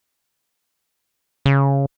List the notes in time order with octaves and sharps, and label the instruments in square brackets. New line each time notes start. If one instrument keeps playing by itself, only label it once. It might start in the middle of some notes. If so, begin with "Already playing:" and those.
[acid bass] C#3